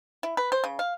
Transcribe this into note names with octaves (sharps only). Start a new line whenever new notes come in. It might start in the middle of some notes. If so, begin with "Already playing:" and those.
E4
B4
C5
C#3
F5